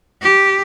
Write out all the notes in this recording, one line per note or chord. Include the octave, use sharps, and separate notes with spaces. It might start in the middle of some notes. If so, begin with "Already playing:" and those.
G4